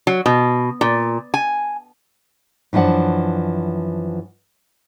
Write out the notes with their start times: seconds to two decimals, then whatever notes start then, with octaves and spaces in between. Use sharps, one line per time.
0.07 F#3
0.26 B2
0.81 A#2
1.34 G#5
2.73 F#2 E3 F3 D4 F#5